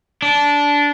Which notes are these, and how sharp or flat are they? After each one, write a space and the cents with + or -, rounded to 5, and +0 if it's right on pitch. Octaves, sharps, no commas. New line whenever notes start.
D4 -15